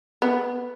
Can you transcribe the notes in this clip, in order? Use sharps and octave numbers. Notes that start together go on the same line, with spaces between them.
B3